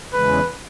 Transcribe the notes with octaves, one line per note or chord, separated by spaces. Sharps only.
E2 C#3 E3 G#3 B4